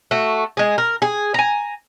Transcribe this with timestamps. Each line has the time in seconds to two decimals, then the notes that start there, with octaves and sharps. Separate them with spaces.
0.11 A3 F#4
0.57 G#3 G#4
0.78 A#4
1.02 G#4
1.34 G#5 A#5